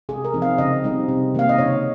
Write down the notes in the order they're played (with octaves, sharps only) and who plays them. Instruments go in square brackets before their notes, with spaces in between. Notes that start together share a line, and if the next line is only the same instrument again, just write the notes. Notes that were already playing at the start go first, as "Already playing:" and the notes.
[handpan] C3 G#4
A#4
F3 C4 D#4
F5
C#3 D#5
G3 C4 D#4
C3
D#3 A#3 F5
D#5
C#3 C#5